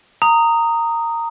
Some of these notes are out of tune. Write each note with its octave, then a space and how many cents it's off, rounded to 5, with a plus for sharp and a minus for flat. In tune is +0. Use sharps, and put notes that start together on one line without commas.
A#5 -15 D#6 +0